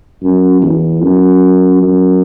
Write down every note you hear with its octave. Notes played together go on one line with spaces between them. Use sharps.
F#2
E2
F#2
F#2